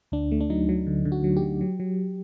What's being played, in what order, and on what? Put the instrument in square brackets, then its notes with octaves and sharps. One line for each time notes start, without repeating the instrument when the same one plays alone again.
[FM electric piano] D2 D4
A3
D4
F#3 D#4
F#3
D3
D3
F#4
F#3
G4
F#3
F#3
F#3